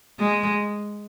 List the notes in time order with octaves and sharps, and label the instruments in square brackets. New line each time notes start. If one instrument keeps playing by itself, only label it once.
[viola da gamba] G#3